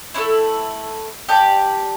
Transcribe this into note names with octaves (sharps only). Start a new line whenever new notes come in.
A3 C#4 E4
G4 D5 A5